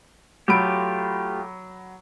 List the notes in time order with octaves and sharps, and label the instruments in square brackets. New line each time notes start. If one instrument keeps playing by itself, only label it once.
[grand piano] F#3 B5 D7 [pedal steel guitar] A3 F4 G4